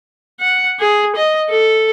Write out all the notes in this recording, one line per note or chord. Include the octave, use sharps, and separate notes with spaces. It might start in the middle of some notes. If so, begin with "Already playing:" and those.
F#5
G#4
D#5
A4